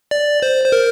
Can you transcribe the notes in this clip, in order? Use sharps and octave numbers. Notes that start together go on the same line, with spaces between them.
D5
C5
C5
A#4